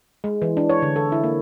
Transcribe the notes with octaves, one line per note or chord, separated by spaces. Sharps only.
G#3
E3
D4
C#5
D3
A4
E4
A#3